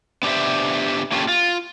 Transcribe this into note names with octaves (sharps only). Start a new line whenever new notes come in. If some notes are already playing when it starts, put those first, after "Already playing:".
B3 D4 G4 C5 E5
A#3 C#4 F4 G4 A4
F4